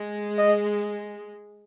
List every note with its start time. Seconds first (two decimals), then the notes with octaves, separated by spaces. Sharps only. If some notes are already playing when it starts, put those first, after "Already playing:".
Already playing: G#3
0.38 D#5